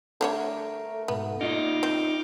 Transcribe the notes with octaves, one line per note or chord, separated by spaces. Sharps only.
D3 G3 A3 A#4 C#5
G#2 B2 B3
D#4 F4 D#5 D6 F6 G6
C4